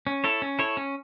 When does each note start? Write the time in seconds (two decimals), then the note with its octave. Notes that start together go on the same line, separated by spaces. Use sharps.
0.07 C#4
0.24 E4 A4 C#5
0.42 C#4
0.59 E4 A4 C#5
0.77 C#4